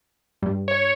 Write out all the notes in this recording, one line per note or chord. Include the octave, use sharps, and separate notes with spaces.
G2
C#5